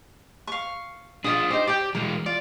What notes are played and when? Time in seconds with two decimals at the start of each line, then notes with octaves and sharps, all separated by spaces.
0.47 F5 C#6
1.24 D4 F4 G#4 C#5 D#6
1.50 D#4 G4 C5
1.67 G4 D5 G5
1.95 E3 G#3 A#4
2.26 F4 D5